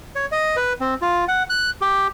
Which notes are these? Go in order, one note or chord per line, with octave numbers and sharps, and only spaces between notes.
C#5
D#5
B4
C4
F4
F#5
F#6
G4